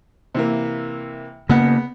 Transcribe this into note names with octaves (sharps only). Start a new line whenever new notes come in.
C3 E3 A#3
C#3 A#3 B3 F#5